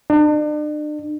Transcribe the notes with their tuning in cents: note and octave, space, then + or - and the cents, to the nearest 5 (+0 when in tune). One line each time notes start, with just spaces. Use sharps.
D4 +40